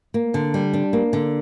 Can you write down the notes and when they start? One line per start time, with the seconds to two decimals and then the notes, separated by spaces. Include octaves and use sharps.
0.14 A#3
0.34 D3
0.54 G3
0.74 D4
0.93 A#3
1.13 D3